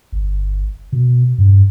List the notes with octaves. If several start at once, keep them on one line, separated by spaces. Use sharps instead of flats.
G1
B2
G2